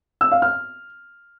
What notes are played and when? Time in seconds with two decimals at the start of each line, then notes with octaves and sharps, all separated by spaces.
0.21 E6
0.32 F5
0.42 F6